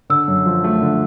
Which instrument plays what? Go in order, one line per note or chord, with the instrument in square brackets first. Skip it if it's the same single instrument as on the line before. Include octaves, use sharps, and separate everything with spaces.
[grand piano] D3 [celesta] E6
[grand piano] F#2
F3
A3
D3